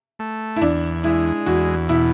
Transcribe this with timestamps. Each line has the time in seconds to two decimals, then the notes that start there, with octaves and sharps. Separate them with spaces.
0.19 A3
0.56 E4
0.61 E2 D4
1.04 G#3 E4
1.46 E2 F#4
1.89 B2 E4